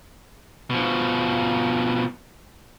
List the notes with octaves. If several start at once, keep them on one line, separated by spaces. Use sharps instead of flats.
B2 F3